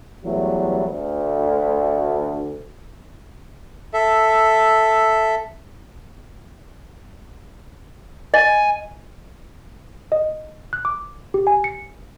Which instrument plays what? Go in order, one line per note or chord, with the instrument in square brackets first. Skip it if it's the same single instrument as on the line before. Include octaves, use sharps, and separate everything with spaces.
[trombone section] E2 E3 F#3 G3 A3
D2
[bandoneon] A4 E5
[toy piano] D#5 [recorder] G#5
[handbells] D#5
F#6
D6
G4
G#5
C#7